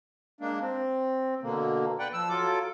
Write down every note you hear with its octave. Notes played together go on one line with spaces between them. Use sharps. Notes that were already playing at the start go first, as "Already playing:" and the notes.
G#3 A#3 D4
C4
B2 D3 A#3
B4 D5 F#5 G5
F3 E6
F#3 F4 A4 D6